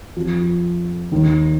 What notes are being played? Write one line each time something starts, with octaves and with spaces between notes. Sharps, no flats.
F2 F3
D#2 D#3